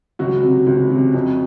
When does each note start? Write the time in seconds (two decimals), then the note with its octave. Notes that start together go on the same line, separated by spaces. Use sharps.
0.19 C#2 F#3 F#4
0.42 C3 F#3
0.67 C#2
0.90 C3 F#3
1.14 F2